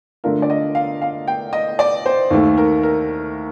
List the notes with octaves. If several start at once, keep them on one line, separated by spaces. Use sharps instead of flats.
D3 A3 D4 F4 A#4
D5
D#5
F5
F5
G5
D#5
D5
C5
D#2 D#3 A3
A#4
A#4